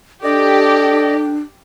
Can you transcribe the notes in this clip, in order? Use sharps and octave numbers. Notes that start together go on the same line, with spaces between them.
D4 G4 A4 D5 D#5